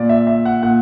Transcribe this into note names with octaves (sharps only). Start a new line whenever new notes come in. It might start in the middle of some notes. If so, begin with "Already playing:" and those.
Already playing: A#2 D5
E5
E5
F#5
A#2 F#5